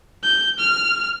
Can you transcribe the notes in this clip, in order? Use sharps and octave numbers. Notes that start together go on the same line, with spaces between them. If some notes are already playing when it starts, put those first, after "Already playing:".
G6
F6